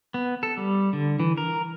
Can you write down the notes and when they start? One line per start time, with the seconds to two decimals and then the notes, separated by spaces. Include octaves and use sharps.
0.14 B3
0.43 A4
0.57 G3
0.93 D3
1.20 E3
1.37 A#4